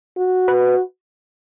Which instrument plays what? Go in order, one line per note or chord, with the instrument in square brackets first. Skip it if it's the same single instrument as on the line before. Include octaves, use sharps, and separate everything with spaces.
[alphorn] F#4
[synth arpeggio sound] B4